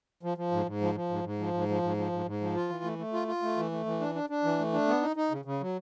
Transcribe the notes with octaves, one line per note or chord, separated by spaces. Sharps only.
F3
F3
G#2
G#2
F3
F3
G#2
G#2
F3
G#2
F3
G#2
F3
G#2
G#2
F3
F4
E3
A3
A3
F4
F4
A3
E3
A3
E3
D4
D4
D4
E3
A3
D4
B3
D#4
D#4
C#3
C#3
F#3